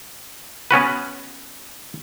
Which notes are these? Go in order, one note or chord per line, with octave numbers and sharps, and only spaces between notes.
B3 C#4 F#4 B4